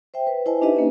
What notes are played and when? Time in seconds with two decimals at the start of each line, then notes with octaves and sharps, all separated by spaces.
0.14 C5 E5 G5
0.27 B4
0.46 E4 B4 C5 D#5 G#5 A5
0.62 D4 D#4 G4 B4 D#5 E5
0.75 A#3 C#4 D4